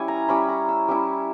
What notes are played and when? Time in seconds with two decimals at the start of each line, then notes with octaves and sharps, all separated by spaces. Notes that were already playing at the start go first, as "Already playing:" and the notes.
Already playing: G3 C#4 E4 G#5
0.08 A#5
0.28 G3 C#4 E4 B5
0.49 A#5
0.68 E6
0.88 G3 C#4 E4